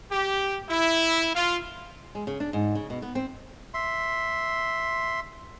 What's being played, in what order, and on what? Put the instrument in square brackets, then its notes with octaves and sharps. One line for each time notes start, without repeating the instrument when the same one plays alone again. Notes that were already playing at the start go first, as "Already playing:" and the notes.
[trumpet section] G4
E4
F4
[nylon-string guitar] G#3
C#3
D4
G#2
C#3
B2
B3
C4
[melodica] E5 C6